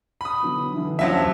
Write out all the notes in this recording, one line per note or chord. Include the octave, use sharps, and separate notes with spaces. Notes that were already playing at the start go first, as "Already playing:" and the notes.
B5 D#6
D3 F#3 B3
D3 E3
C#2 F3 F#3 F4 E5 E7
D#2 A5